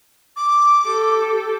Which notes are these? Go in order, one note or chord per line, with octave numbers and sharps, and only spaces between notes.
D6
G4 A4